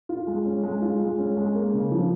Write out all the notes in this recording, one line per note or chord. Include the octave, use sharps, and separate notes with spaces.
F4
G#3
C#4
G#3
F4
G#3
C#4
G#3
A#3
C#3
F3